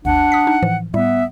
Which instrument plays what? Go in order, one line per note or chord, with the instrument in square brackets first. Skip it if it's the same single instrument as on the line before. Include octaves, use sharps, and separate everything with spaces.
[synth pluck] G#1 D#2 [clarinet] D4 [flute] F#5
[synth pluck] D#6 B6
D#4
A2 E3 F3
[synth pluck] A2 G3 [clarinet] B3 [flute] E5